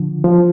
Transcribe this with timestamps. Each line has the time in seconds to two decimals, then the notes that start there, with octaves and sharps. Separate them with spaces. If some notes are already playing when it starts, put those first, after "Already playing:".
Already playing: D3 F3
0.24 F3